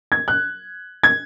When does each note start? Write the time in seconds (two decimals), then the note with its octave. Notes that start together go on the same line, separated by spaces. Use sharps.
0.12 G#6
0.28 F#6
1.03 G#6